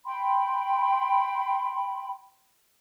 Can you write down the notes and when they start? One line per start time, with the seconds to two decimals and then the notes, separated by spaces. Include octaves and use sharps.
0.06 G5 B5 C6